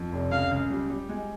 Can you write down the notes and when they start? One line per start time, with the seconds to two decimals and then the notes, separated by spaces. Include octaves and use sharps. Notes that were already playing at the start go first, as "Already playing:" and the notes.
Already playing: F2
0.12 F1
0.32 C#2 F5
0.51 C#2
0.70 G3
0.90 G3
1.09 G#3